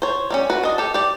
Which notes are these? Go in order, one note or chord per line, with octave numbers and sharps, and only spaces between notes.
C5 C#5
G3 A#3 C#4
F#4 B4
D4 D#5
G4 A4
G4 D5